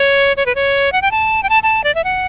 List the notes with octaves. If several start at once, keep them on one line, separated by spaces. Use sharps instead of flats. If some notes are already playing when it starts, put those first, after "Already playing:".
Already playing: C#5
C#5
B4
C#5
F#5
G5
A5
G5
A5
A5
D5
E5
F#5